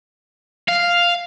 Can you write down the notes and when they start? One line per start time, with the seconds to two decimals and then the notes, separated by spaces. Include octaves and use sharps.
0.68 F5